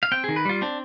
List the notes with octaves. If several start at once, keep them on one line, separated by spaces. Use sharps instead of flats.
F5
C4 G5
D#3 G#4
B4
G3 F4
C4 D4